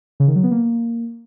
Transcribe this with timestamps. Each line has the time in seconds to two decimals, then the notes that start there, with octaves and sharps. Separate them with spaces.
0.20 C#3
0.28 D#3
0.35 F#3
0.43 B3
0.51 A#3